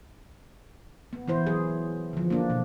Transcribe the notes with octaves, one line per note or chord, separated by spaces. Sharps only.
B3
E3 E4 C5
F#3 G#4
D3 F3
A#3 D4
B2